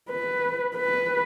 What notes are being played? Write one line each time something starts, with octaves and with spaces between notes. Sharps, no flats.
B4
B4